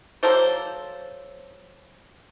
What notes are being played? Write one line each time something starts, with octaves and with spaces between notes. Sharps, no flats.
F#3 A#3 A4 C5